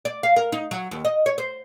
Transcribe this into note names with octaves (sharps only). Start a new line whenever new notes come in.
D5
F5
A#4
D#4
F#3
D#2
D#5
C#5
C5